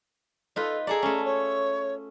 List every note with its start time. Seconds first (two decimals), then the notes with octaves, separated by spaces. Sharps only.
0.56 D#4 F4 A4 B4
0.87 G#4 A4 D5 A#5
1.03 A3 C#4
1.24 C#5